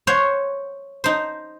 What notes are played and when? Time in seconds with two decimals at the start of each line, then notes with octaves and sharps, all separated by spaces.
0.07 C5 C#5 F#5
1.04 D#4 C5